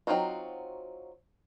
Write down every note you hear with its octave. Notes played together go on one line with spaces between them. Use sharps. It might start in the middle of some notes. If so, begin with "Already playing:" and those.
F#3 C4 D#4 F4 F#4